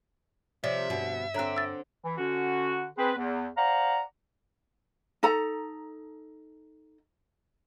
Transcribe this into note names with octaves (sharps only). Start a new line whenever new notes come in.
C3 F3 C#5 D5 E5
D2 G2 B2
D3 C4 C#5 A#5 F#6
E6 A6
E3
D3 C#4 F#4
C4 G#4 B4
E2
C5 D5 F5 F#5 A#5
D#4 A4 A#5